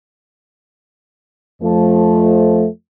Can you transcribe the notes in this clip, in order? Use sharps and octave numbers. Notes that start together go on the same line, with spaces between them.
F2 F3 A3